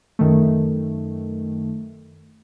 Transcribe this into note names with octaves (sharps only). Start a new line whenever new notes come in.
F#2 D#3 A3